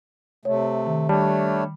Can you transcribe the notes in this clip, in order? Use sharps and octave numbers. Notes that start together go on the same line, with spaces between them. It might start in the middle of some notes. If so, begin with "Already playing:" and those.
C3 A3 C#5
D#3
G3 A3 D4 C#5 A5